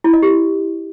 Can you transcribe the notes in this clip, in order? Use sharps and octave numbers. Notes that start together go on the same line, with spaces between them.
E4
D#5
G4